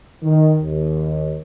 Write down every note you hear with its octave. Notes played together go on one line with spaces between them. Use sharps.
D#3
D#2